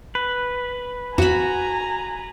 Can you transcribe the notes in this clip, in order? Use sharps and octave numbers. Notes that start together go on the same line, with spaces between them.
B4
F2 F#4 G#5 A#5 B5 E7